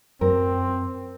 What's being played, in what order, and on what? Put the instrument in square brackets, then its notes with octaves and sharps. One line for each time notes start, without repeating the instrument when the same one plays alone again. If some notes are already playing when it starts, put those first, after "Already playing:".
[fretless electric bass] F#2 [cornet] C4 [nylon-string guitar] A#4